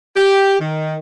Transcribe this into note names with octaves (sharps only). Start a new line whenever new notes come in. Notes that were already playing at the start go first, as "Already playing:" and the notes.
G4
D#3